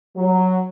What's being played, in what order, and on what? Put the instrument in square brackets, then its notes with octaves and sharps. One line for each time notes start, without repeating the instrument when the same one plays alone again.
[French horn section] F#3